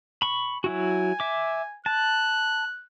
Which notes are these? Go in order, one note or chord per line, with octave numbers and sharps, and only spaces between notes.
B5 C#6
F#3 E4 F#4 G#5
E5 D6
A5 F#6